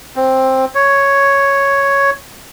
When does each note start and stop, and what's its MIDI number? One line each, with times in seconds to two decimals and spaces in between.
0.16 0.65 60
0.75 2.11 73